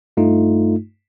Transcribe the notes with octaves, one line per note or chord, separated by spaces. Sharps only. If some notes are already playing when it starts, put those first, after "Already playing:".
G2 A3 D#4 F4